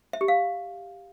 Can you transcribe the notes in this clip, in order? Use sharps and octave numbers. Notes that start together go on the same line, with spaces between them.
E5
G4
F5